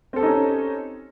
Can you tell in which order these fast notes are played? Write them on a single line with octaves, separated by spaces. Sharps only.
C4 A4 G4 D#4 C#4